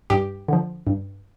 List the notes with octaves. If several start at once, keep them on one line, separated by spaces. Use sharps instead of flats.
G2 G4
D3 F3
G2